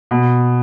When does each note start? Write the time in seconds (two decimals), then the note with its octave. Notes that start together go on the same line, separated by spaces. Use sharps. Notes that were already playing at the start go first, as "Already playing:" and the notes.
0.11 B2